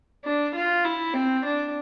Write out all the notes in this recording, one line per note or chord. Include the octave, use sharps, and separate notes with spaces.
D4
F4
E4
C4
D4